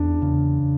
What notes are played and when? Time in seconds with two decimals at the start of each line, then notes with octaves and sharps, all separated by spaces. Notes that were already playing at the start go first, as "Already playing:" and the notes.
Already playing: E2 D4
0.22 C#3